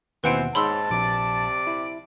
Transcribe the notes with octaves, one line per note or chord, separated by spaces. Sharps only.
D#2 B2 E3 C4 B4 F#5 D7
G#2 C#5 A5 B5 C6 E6
A#1 C3 D5
E4